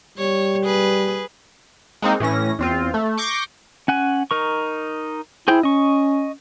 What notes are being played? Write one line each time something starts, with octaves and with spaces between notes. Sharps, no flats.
G3 C#5
G#4 B4
G#3 A#3 C4 D#4
A2 E3 C#4 A#6
E2 C4 F4
A3
C#6 D6 G6 A#6 C7
C#4 F#5 G#5
D#4 A#4 C#6
E4 G#4 C5 G5
C#4 D#5 C#6